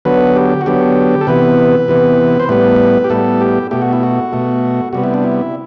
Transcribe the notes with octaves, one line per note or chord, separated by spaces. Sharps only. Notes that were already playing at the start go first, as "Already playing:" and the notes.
D3 F#3 B3 B4
G4
F#4
D3 F#3 B3 G4
A4
C3 E3 B3 B4
C3 E3 B3
C5
A2 G3 B3 B4
G4
A2 G3 B3 A4
G4
B2 A3 G4
F#4
E4
F#4
B2 A3
C3 G3 B3 F#4
E4
D4
E4